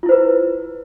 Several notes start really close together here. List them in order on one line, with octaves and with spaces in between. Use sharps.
F4 E4 C5 B4